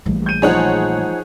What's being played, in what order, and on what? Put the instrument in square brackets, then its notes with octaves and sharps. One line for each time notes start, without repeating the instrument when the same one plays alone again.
[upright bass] A#1 A#2 [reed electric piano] E3 G3 A3
[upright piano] G6 D#7
[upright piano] F3 D#4 [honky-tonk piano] G#4 C#5 F#5